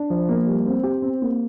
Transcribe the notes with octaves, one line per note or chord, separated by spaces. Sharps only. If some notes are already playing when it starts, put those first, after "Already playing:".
Already playing: D4
F3
A#3
G3
C4
G4
C4
A#3